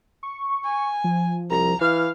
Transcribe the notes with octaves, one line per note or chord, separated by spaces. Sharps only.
C#6
G#5
F3
C2 A#5
E3 F5 F6